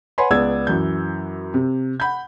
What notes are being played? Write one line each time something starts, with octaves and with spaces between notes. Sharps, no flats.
B4 C#5 F#5 G#5 B5 C6
C#2 B3 G#4 D5 E6 G#6
F#2 E3 G6
C3
F#5 B5 G6